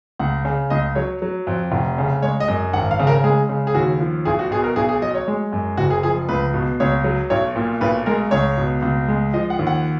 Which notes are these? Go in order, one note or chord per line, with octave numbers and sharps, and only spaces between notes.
C#2 F#5
C#3
C#2 D#5
F#3 C#5
F#3
F2
F1
C#3
G#3 C#5
D#5
F#2
G#1 F#5
F5
C#3
A#4
G#3 G#4
C#3
G#4
D#2 F#4
F3
B1 G#4
F#4
B2 G#4
A#4
B1 G#4
G#4
F#3 D#5
C#5
G#3
F#2
F#1 F#4
G#4
F3 G#4
C#2 B4
B2
C#2 C#5
F#3
B1 C#5
A#2
B1 B4
G#3 A#4
C#2 C#5
B2
C#2
G#3
F3 D#5
F#5
D#2
F#5